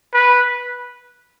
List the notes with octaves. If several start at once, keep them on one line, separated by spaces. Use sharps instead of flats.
B4